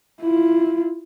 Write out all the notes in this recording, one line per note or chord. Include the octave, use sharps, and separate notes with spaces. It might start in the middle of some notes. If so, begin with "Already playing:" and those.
E4 F4